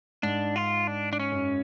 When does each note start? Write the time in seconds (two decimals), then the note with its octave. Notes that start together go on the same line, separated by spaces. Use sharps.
0.23 G#2 D4
0.56 F4
0.87 D4
1.13 D4
1.20 C#4
1.32 F#2